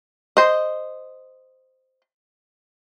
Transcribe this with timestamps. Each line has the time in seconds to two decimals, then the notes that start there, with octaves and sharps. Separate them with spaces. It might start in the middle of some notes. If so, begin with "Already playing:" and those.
0.37 C5 D#5